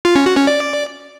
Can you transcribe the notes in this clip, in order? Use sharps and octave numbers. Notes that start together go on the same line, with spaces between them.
F4
C#4
F#4
C#4
D5